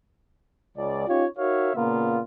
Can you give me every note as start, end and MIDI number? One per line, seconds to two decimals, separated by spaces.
0.78 1.07 37
0.78 1.07 74
1.08 1.26 61
1.08 1.26 63
1.08 1.26 65
1.08 1.26 67
1.08 1.26 73
1.38 1.71 63
1.38 1.71 66
1.38 1.71 70
1.38 1.71 73
1.38 1.71 76
1.38 1.71 77
1.75 2.21 46
1.75 2.21 49
1.75 2.21 58
1.75 2.21 59
1.75 2.21 65